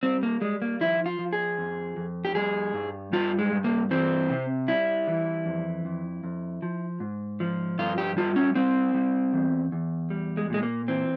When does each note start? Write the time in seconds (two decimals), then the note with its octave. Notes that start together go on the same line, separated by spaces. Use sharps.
0.03 G3 C4
0.23 A#3
0.41 G3 G#3
0.62 A#3
0.81 F3 E4
1.06 F4
1.19 F3
1.33 G#4
1.59 F2
1.97 F2
2.25 G4
2.35 G3 G#4
2.74 G2
3.13 G3 F4
3.39 G#3
3.52 G2
3.64 A#3
3.91 E3 C4
4.30 C3
4.68 G3 E4
5.08 E3
5.46 F2
5.85 F2
6.24 F2
6.62 F3
7.00 G#2
7.40 F3
7.79 G2 F4
7.98 G4
8.17 G3 F4
8.36 C#4
8.55 G3 C4
8.94 G3
9.33 E2
9.72 E2
10.10 G3
10.37 G#3
10.50 A#2 G#3
10.63 A#3
10.88 E3 C4